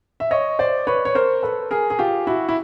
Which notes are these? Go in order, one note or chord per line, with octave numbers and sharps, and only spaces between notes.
E5
C#5 D#5
C5 D5
B4 C#5
C#5
A#4 C5
A4 B4
G#4 A#4
G#4
F4 G4
E4 F#4
E4